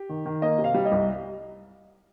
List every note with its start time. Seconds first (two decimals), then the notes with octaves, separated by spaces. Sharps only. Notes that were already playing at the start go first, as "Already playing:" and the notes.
Already playing: G4
0.09 D#3
0.26 D#3
0.42 A#3 D#5
0.58 C3
0.64 F5
0.74 G3
0.85 D#5
0.92 C2